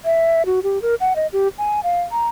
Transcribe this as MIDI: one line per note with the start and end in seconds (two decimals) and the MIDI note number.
0.05 0.46 76
0.46 0.60 66
0.63 0.81 67
0.82 0.95 70
1.00 1.14 78
1.16 1.27 75
1.33 1.48 67
1.58 1.80 80
1.84 2.01 77
2.12 2.29 82